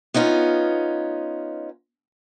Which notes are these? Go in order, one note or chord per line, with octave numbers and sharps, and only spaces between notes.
B3 C#4 D#4 F4